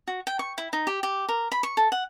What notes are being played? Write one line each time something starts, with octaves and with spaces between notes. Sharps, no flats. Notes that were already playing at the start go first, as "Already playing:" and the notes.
F#4
G5
C#6
E4
D#4
G4
G4
A#4
B5
C#6
A4
F#5